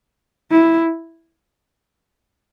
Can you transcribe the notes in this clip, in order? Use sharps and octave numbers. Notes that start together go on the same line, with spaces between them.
E4